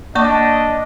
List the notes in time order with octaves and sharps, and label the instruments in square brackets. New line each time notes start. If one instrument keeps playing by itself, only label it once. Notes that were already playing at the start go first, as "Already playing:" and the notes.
[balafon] A#3 D5 C#6 [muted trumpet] D4 [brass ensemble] D#5